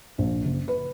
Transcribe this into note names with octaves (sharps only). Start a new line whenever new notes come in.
A#1
F#1
B4